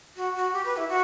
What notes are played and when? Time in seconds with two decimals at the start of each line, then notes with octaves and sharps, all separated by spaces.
0.16 F#4
0.35 F#4
0.53 G4
0.65 B4
0.77 E4
0.89 F#4